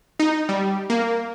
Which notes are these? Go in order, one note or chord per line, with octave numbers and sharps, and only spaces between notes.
D#4
G3
A#3